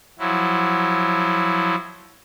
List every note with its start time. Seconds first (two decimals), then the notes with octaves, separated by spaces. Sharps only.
0.19 F3 F#3 E4